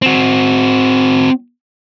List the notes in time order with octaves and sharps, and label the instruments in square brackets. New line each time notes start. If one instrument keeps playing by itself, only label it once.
[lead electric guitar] C4 F#4